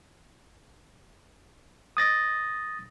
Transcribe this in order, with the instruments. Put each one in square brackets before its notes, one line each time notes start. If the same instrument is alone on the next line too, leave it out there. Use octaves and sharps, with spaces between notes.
[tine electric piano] D#6 A6 A#6